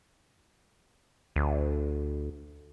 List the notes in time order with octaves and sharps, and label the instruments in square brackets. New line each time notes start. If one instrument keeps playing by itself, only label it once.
[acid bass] D2